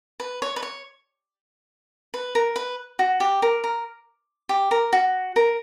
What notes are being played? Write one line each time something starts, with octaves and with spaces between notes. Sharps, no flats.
B4
C#5
B4
C#5
B4
A#4
B4
F#4
G4
A#4
A#4
G4
A#4
F#4
A#4